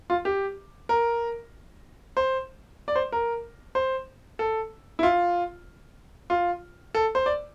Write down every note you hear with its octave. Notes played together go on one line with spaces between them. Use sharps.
F4
G4
A#4
C5
D5
C5
A#4
C5
A4
E4
F4
F4
A4
C5
D5